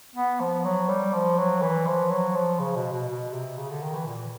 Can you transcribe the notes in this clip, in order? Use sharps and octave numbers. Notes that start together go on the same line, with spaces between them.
B3
F3
F#3
G3
F3
F#3
E3
F3
F#3
F3
C#3
B2
B2
B2
C3
C#3
D3
D#3
E3
A#2